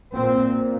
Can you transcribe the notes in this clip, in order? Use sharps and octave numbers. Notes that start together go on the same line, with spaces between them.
A#2 C4